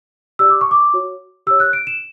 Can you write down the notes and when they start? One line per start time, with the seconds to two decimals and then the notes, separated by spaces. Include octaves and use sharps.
0.39 G4 D5 E6
0.50 D6
0.61 C#6
0.71 D6
0.94 F#4 C#5
1.46 G4 E6
1.50 C#5
1.60 F#6
1.73 D7
1.87 E7